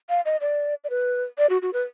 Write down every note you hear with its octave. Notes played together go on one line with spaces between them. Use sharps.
F5
D#5
D5
D5
B4
D5
F#4
F#4
B4